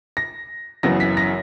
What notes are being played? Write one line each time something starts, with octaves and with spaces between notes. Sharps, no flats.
A#6
F#1 F#2 C#3 E3 B3 A#6
B6
A#6